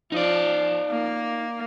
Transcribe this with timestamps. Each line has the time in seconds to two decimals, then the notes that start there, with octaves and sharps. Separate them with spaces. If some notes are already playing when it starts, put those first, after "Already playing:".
0.12 F3 D#4 D5
0.90 A#3